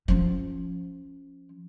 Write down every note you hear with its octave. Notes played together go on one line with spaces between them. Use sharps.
F3 C#4